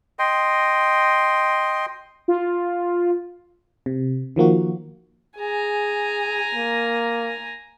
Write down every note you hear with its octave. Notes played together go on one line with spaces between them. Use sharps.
D#5 G5 C6
F4
C3
D#3 F3 A#3 F#4
G#4 G#5 A#5
A#3